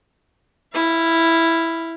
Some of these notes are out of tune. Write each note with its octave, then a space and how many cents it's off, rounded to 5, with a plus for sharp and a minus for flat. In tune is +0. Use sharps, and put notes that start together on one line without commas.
E4 +0 F5 -25